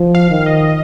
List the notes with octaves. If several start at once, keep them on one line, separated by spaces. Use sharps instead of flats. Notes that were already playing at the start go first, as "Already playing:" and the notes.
Already playing: F3
F5
D#3
D#5